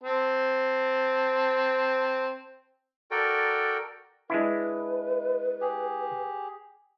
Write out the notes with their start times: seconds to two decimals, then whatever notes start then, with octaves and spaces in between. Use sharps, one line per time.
0.04 C4 A5
3.11 F#4 A4 A#4 D5 G5
4.30 G#3 D4 E4 B4
5.61 G4 G#4